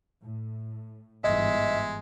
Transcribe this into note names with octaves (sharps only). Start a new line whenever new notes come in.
A2
G1 G#2 E3 G#3 D#5 E5